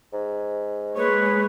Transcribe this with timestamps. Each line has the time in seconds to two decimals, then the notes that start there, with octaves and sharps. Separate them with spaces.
0.13 G#2
0.97 G#3 A#3 B4 C#5